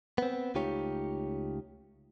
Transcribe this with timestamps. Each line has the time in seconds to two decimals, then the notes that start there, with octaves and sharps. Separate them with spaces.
0.18 B3 C4
0.55 C#2 A3 D#4 F4 G4 C#5